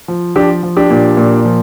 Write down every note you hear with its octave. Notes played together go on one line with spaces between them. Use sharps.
F3
F3 D4 G4
F3
D4 G4
A#2
A#2
F3